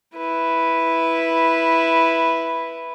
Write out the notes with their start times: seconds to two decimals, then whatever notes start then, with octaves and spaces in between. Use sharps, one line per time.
0.16 E4 B4